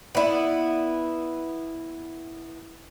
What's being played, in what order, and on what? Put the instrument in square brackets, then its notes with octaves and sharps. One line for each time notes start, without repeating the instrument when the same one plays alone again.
[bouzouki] B3 E4 [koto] D5